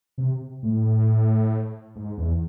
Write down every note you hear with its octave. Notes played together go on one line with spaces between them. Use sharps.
C3
A2
G#2
E2